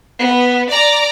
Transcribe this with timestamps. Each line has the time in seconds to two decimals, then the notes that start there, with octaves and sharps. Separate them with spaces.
0.21 B3
0.69 D5 A#5 D6